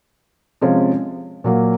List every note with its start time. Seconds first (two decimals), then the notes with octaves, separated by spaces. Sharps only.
0.62 C3 F3 G#3 C#4
1.44 A#2 F#3 A#3